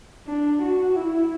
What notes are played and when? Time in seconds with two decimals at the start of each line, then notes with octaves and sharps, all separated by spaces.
0.27 D4
0.62 F#4
0.96 E4